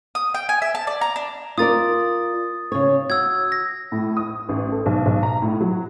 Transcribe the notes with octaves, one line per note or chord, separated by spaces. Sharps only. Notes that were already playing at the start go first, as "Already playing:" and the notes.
D#6
G5
G#5
E5
A5
D5
A#5
D4
F4 A#4 D5 D#6 A6
C#3 C#5
F#4 E6 G#6
A#6
A2
D#6
A1
A4
B1
B1
A#5
A2
F#3